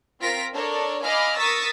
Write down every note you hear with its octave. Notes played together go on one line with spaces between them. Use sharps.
C4 F4 A#4 A#6 B6 D7
D4 A4 A#4 C#5 D5
D#5 F5 G#5 B5 D6 F6
A#4 C#6 D#6 E6 A6 B6